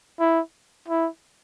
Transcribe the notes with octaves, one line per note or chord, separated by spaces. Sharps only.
E4
E4